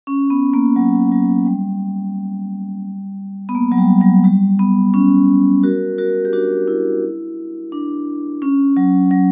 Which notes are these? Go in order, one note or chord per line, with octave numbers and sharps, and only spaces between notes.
C#4
B3
A#3
F#3
F#3
G3
B3
A#3
F#3
G3
F#3
G3
B3
C#4
F#4 A#4
F#4 A#4
G4
D4 F#4
E4
D4
C#4
F#3
F#3